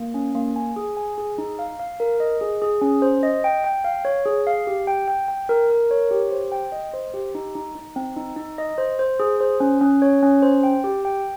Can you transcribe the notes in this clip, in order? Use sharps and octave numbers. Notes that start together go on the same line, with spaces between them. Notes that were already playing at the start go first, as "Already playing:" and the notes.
Already playing: A#3
C#4
A#3
G#5
G#4
G#5
G#4
D#4
F5
F5
A#4
D#5
G#4
G#4
C#4
C5
D#5
G5
G5
F5
C#5
G#4
F5
G4
G5
G5
G5
A#4
A#4
C#5
G4
C5
G5
D#5
C5
G4
D#4
D#4
D#4
C4
D#4
D#4
D#5
C5
C5
G#4
C5
C#4
C#4
C#5
C#4
C5
G5
G4
G5